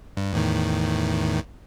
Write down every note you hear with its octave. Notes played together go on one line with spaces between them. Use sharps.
G2
E2 A2 D#3